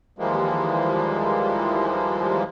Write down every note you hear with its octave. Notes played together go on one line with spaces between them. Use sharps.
D#2 E3 F3 G3 G#3 A#3